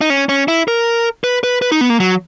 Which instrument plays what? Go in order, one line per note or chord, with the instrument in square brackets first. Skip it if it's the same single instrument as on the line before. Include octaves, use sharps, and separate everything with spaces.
[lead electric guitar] D#4
C#4
C#4
E4
A#4
B4
B4
B4
D#4
B3
A#3
F#3